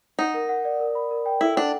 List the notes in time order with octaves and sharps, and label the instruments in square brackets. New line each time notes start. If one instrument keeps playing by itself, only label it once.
[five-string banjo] D#4 [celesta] F#5
[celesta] A#4
F#5
D5
A#4
B5
A#4
G5
[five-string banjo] E4 [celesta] A4
[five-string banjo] D4 [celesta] F#5